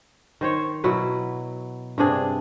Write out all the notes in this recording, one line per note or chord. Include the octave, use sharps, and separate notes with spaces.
D#3 C5 C#5
B2 F#3 E4 B4
G2 C3 D4 G#4